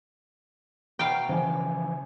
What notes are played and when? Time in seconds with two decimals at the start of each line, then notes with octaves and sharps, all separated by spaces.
0.99 B2 F5 G5 A#5
1.29 C#3 E3 F3 C5 G#5